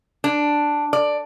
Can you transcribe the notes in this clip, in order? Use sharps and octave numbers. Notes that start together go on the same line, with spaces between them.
D4
D5